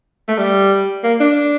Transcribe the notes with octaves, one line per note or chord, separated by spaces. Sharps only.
A3
G3
A#3
D4